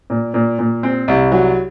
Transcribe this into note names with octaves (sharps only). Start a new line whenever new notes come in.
A#2
A#2
A#2
C4
C2
F#3